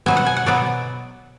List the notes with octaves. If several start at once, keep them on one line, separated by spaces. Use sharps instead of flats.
B2 F#3 B3 G#5
F#5
G#5
F#5
B2 F#3 B3 D5